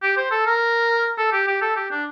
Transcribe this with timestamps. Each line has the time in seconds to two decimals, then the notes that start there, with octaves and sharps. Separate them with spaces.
0.02 G4
0.17 C5
0.31 A4
0.46 A#4
1.18 A4
1.32 G4
1.47 G4
1.62 A4
1.76 G4
1.91 D4